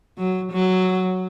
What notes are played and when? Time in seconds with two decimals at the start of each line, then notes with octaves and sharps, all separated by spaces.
0.18 F#3
0.52 F#3